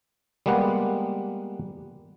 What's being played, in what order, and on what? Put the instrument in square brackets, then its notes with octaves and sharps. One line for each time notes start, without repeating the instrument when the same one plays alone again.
[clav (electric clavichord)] G3 G#3 A#3 B3 F#5